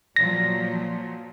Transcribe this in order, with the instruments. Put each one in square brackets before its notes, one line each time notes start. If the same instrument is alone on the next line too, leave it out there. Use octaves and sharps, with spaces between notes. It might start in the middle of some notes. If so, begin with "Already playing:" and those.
[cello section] A#2 F3 F#3 [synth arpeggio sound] A#6